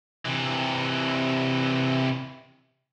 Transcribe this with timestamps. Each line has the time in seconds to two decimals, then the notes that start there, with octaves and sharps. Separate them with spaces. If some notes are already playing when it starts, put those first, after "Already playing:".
0.25 C3 E3